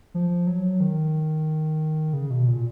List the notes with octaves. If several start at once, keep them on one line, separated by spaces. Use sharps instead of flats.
F3
F#3
D#3
C#3
B2
A#2